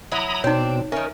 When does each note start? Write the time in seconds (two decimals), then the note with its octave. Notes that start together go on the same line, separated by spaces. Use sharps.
0.12 F#3 E4 A#5 B5 D#6
0.44 B2 C4 D4 D#4 C#5
0.92 D#3 C#4 A#4 E5